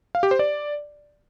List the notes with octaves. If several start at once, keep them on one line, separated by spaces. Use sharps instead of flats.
F5
G4
C5
D5